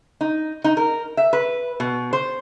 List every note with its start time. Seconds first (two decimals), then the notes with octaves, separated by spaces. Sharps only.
0.21 D#4
0.64 D#4
0.77 A#4
1.17 E5
1.33 B4
1.80 B2
2.13 C5